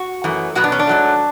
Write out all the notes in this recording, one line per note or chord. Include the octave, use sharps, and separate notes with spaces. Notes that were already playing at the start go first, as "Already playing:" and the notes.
Already playing: F#4
F#2 E3 A3
B2 F#3 B3 F#4
D4
C#4
D4
G#2 F#3 A3